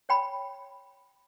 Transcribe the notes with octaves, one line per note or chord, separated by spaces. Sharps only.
C#5 G5 B5